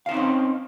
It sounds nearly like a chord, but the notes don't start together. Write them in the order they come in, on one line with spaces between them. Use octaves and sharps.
F5 C5 D#4 C#4 C4